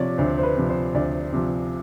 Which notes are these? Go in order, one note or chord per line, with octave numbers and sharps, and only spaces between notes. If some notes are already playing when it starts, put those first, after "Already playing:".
Already playing: C3 F3 C#5 D5
D2 C5
C5
B4
C3 F3
C5
D2 D5
C3 F3